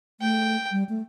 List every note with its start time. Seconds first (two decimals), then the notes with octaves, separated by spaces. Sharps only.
0.21 A3 G5
0.71 G3
0.89 A3